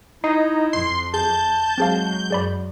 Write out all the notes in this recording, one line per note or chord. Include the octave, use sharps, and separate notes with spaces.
D#4 E4 C7
F2 C6
G#4 A5 G6
F#3 G#3 C4 G#4 F5
F#2 G#4 D5 B5